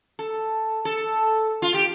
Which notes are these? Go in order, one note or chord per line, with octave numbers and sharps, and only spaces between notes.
A4
A4
F4
G4